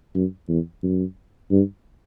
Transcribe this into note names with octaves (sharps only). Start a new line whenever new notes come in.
F#2
E2
F#2
G2